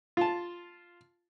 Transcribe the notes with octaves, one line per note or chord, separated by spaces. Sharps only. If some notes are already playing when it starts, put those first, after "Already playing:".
F4 A5